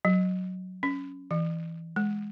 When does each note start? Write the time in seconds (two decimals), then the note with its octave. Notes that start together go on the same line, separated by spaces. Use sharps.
0.05 F#3
0.83 C#4
1.31 E3
1.96 G#3